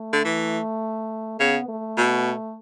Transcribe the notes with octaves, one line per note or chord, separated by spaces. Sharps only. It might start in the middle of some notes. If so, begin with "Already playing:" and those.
Already playing: A3
D3
E3
C#3 B3
A3
B2